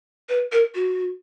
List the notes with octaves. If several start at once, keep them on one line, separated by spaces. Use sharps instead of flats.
B4
A#4
F#4